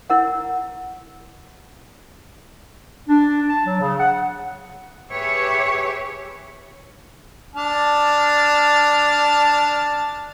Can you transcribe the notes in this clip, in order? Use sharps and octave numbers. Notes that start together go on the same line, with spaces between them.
E4 A#4 F#5
D4
A5
F#3
C#3
F#5
G4 G#4 B4 C#5 E5
D4 A5 F6